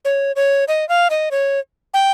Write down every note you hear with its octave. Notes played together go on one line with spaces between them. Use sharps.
C#5
C#5
D#5
F5
D#5
C#5
G5